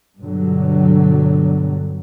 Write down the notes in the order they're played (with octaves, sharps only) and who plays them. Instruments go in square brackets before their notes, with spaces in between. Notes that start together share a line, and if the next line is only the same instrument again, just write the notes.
[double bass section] G2 B2 D3 F#3 G3